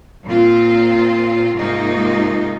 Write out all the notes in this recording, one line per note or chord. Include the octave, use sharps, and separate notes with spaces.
A#2 C4 F4
G#2 C3 A#3 D#4 F4